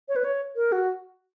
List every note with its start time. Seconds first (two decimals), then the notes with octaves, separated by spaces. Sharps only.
0.08 C#5
0.16 B4
0.24 C#5
0.56 A#4
0.72 F#4